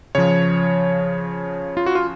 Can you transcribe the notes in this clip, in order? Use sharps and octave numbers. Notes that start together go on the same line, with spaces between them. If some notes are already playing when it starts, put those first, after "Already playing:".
C#3 F3 C#5
F4
F#4
F4